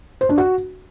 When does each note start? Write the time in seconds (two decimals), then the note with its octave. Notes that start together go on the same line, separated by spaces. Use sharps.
0.21 C5
0.29 D4
0.38 F#4